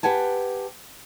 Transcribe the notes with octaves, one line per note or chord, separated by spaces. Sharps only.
G4 B4 F#5 G#5 A5